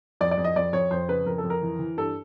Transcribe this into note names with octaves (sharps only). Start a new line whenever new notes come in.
F2 D5
D5
F2
D#5
F2 D5
F2 C#5
F2 C5
C#3 B4
F2 A#4
A4
F2
A#4
E3
E3
G2 A4